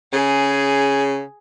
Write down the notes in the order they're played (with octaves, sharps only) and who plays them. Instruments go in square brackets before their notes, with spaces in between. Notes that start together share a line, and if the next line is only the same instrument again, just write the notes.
[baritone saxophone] C#3 [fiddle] G#4